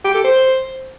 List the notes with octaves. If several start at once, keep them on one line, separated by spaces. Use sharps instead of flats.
G4
A4
C5